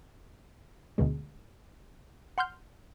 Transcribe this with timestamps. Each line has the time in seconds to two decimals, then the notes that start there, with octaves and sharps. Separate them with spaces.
0.98 D2 B2 G#3
2.38 F#5 C6 F6 G6